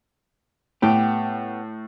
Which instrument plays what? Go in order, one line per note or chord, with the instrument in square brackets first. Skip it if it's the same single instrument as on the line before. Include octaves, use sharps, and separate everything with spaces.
[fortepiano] A2 [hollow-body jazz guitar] B3 G4